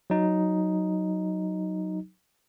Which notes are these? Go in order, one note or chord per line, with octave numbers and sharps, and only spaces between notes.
F#3 D#4